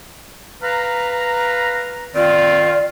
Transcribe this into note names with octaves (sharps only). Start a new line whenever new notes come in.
B4 F5 A#5
D#3 C4 F4 D5